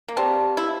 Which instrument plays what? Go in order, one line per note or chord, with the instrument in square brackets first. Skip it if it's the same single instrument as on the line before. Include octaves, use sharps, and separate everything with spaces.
[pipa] A#3
[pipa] C4 [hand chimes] G4 D5 F5 A5
[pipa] E4